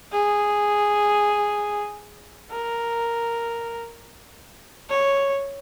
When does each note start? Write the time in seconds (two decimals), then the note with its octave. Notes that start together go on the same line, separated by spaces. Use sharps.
0.12 G#4
2.51 A#4
4.90 C#5